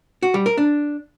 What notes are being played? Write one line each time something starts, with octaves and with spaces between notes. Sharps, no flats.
F#4
G3
A#4
D4